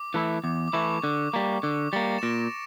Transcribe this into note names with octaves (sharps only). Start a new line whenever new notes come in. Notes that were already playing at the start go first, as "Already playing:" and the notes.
Already playing: D6
E3 A3 E4
E2 D6
D6
E3 A3 E4 C#6
D3 D6
G3 A#3
D3 D6
G3 A#3 A6 C#7
E7
A#2 A#6 D7